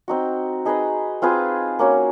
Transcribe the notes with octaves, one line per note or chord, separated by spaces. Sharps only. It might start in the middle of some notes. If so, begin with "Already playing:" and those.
C4 D#4 F#4
D#4 G#4 B4 D#5
C4 F4 G#4 B4
A#3 C#4 F#4